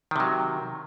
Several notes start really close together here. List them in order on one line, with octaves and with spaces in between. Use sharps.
D#3 C3 F#3